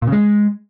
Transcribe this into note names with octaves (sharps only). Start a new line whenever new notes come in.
A#2
C#3
G#3